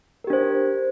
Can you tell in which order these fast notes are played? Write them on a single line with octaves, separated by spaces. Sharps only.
A#4 G4 D4 C5